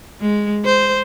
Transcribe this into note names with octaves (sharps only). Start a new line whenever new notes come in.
G#3
C5